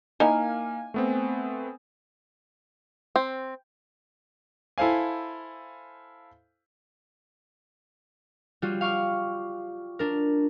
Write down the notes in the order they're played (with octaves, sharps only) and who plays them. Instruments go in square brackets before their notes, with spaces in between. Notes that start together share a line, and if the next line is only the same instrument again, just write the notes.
[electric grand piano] A#3 F5 [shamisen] D#4 E4 A#4 [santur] G#5
[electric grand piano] A3 B3 C4
[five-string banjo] C4
[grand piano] E4 A4 C5 F5 G#5
[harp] G3 F4 F#4
F5 C#6 D6 F6
D4 A#4